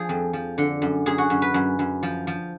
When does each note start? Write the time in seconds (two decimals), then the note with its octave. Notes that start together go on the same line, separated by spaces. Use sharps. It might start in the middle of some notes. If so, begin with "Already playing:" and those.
Already playing: F3 G#4
0.09 F2
0.33 F3
0.58 D3
0.82 F#2
1.06 F#2 G#4
1.18 F#4
1.30 F#2
1.42 B4
1.54 F#2
1.79 F#2
2.03 F3
2.27 F3